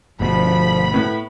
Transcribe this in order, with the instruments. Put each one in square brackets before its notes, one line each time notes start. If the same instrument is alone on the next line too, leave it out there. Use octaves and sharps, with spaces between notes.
[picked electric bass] G1 D2 B2 [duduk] F3 [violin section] B5
[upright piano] A2 B3